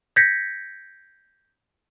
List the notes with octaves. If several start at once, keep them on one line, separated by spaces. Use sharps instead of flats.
G6 G#6 A#6 B6 C#7